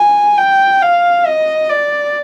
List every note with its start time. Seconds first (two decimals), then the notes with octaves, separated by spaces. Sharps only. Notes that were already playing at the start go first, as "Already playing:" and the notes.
Already playing: G#5
0.38 G5
0.82 F5
1.26 D#5
1.70 D5